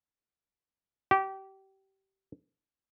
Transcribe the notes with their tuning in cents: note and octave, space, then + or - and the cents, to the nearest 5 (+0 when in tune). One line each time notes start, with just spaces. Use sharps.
G4 -25